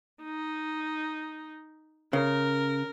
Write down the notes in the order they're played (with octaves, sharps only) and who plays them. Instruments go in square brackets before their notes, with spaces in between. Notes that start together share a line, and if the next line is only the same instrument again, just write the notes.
[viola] D#4
[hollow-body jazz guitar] C#3 [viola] A#4